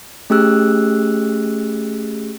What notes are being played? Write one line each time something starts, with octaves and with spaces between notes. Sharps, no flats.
A3 C#4 G4 G#4 E6 F#6